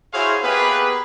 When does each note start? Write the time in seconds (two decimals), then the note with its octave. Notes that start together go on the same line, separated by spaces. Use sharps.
0.14 E4 F#4 G#4 C5 C#5 F5
0.44 A#3 B3 G4 G#4 B4